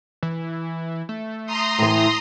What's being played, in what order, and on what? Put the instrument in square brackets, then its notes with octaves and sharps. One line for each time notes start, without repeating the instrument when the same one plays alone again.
[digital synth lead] E3
A3
[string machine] A#5 C6 D#6
[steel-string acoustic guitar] A2 E3